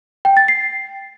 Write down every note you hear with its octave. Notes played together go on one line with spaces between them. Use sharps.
G5
A6
C7